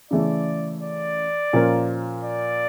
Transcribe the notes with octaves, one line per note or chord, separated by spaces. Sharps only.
C#3 E3 A3 D5
D5
A#2 F3 C#4 F4 A#4
D5